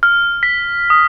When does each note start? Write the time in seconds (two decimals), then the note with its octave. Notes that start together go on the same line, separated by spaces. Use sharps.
0.03 F6
0.43 B6
0.90 D#6